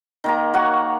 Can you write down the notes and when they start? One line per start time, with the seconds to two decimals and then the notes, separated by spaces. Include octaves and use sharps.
0.24 D#3 A#3 A#5
0.54 F#4 C#5 F#5